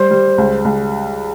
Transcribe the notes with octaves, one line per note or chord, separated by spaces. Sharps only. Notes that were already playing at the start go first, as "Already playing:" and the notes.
Already playing: G3 C5
G3
C#2
C#2